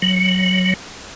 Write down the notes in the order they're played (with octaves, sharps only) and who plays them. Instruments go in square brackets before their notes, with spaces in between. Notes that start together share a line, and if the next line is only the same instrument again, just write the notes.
[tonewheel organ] F#3